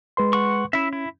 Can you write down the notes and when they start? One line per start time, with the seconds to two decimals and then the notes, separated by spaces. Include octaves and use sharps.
0.17 G#3 B4 C6
0.33 F#5 C#6
0.73 C#4 E4 E5
0.93 E4